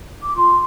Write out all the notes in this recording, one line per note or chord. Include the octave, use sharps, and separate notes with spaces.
D6
F4 C6